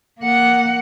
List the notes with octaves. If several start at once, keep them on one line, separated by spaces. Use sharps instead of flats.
A#3 F#5